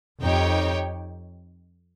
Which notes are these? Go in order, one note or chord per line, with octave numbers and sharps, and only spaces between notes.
F2 D#4 G4 C#5 G5